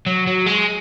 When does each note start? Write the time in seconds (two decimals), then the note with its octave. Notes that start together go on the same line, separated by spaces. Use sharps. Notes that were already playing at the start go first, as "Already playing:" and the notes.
0.06 F#3
0.27 F#3
0.46 G#3